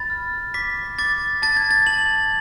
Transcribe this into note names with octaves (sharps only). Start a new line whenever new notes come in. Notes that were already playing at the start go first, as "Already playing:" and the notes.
Already playing: B5 A6
F6
D6 B6
D6 A6
A5 A6
G#6
A6
A5 F#7